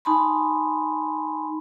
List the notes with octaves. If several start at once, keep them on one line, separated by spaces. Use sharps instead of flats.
D#4 G#5 A5 B5 C6